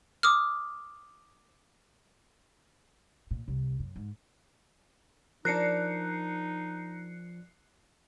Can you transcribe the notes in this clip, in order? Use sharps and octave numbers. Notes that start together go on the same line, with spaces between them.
D6 D#6 F6
A#2
C2
F#2
G#2
F3 D4 D#4 A#4 F#6 C7 C#7